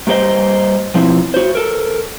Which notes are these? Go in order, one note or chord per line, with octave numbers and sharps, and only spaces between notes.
G2 A#3 G4 C5 D#5
B2 F3 C4 E4
F#4 C5
A4 A#4